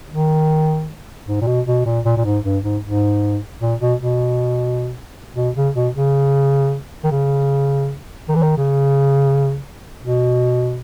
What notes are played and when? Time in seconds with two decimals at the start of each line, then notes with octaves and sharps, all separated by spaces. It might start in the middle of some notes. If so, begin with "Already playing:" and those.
0.11 D#3
1.28 G#2
1.41 A#2
1.47 B2
1.67 B2
1.86 A#2
2.05 A#2
2.17 A#2
2.25 G#2
2.44 G2
2.64 G#2
2.83 G#2
3.61 A#2
3.80 B2
4.00 B2
5.36 B2
5.56 C#3
5.75 B2
5.94 C#3
7.04 D#3
7.11 C#3
8.28 D#3
8.36 E3
8.42 D#3
8.57 C#3
10.03 B2